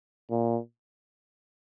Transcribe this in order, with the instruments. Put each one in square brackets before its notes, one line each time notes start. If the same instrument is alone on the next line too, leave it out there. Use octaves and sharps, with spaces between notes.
[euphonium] A#2